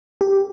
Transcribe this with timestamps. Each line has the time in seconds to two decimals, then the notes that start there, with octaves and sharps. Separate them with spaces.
0.21 G4